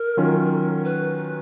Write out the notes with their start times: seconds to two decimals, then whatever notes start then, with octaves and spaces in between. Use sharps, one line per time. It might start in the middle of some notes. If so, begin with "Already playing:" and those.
Already playing: A#4
0.17 D#3 F#3 C#4 F4
0.84 B4